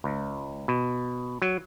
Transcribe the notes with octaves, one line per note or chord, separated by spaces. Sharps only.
C#2
B2
F#3